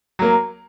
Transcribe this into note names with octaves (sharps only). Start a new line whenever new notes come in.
F#3 A#3